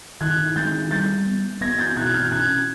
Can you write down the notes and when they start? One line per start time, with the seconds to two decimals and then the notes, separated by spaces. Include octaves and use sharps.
0.21 D#3 F#6 G#6
0.56 G#3 G6 A6
0.91 G3 G6 A6
1.26 B3
1.61 B3 G#6 A#6
1.78 G6 A6
1.97 B2 F#6 G#6
2.14 F6 G6
2.32 C#4 F#6 G#6